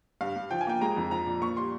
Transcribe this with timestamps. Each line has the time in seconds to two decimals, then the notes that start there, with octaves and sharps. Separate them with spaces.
0.21 G2 F5
0.36 G2
0.51 F3 G5
0.61 G#5
0.67 A#3 G5
0.81 G#3 A#5
0.97 F2
1.11 F3 A#5
1.27 A#2
1.42 A#3 C#6
1.57 G3 C6